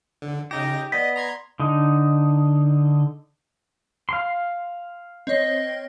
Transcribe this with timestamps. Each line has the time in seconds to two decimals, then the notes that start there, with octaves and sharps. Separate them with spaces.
0.22 D3
0.51 C#3 D#4 G4 A#6
0.92 B3 D5 D#5 B6
1.16 A#5 C6 G#6
1.60 D3 D#4
4.09 F5 C6
5.27 C4 C#5 D#5